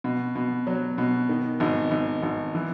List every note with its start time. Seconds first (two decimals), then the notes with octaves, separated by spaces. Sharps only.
0.04 B2
0.36 B2
0.67 F#3
0.98 B2
1.29 D#3
1.60 G#1
1.91 G#1
2.22 G#1
2.55 E3